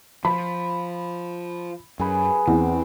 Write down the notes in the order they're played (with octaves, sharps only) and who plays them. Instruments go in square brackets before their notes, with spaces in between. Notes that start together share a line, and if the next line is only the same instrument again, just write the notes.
[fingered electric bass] F3 [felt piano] B5
[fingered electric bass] F#2 [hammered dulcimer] G#4 B4
[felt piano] E2 [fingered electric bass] C4